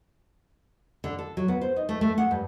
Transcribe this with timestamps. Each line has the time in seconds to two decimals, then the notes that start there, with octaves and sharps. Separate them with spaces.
1.04 D3
1.19 A4
1.37 F#3
1.48 B3
1.61 C5
1.76 D#4
1.89 A3
2.01 A3
2.18 F#5
2.31 G2